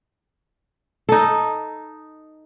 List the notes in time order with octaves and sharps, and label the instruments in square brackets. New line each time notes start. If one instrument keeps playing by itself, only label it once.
[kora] D#4 A4